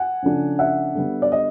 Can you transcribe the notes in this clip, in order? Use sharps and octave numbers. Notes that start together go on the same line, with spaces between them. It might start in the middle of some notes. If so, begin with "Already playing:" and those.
Already playing: F#5 G#5
C#3 F3 A3 D4
E5 F#5
D3 G3 B3
D5
D#5